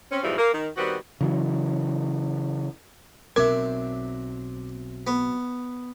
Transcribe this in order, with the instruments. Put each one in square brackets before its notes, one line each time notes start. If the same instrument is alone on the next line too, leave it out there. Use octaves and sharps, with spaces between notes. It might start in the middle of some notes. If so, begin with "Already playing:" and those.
[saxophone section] C4 C#4
G#2 B2 E3 F3 G3
A#3
D#3
D#3 G3 B3 C4 F#4
[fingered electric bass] C#3 E3 F#3
[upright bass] B1 B2 [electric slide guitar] F#3 C4 E5 [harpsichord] D4 [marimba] A#4
[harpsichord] B3